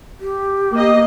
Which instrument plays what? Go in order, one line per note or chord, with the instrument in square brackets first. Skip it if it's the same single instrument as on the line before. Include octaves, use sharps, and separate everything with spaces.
[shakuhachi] G4
[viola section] A#3 B3 D#5